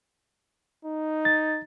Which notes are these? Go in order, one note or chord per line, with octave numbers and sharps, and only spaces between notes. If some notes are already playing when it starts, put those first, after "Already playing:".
D#4
A6